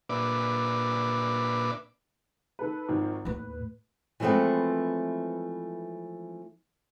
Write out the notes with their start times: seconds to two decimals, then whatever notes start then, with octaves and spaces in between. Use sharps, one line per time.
0.09 A#2 D4 B4 D5 E5 D6
2.59 D#3 A4 B4
2.89 G#1 D#3 F3
3.25 D#2 A2 B4
4.20 E3 F3 G#3 A3 B3 C4